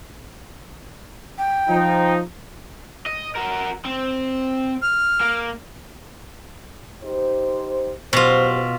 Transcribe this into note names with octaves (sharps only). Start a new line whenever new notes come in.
G5
F3 D#4
D#5
F#4 A#4
C4
F6
A#3
D#4 G4 C5
B2 F#3 F4 G4 C5